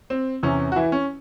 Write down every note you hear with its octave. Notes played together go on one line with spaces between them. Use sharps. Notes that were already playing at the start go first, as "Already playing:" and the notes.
C4
E2 C3 E3 C#4
F#4
E3 E4
C#4